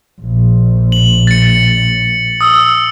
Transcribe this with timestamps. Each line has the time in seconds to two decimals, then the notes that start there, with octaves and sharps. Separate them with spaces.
0.21 A#1
0.92 F#7
1.27 A6 C#7
2.41 D#6 E6